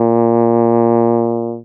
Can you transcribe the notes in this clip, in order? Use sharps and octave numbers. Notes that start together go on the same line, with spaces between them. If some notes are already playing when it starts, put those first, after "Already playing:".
Already playing: A#2